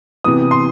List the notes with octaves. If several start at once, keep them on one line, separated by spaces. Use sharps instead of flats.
C3 E3 B3 D#6
C6